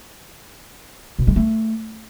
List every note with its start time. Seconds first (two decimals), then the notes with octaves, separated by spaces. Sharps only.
1.19 B2
1.27 G#3
1.36 A3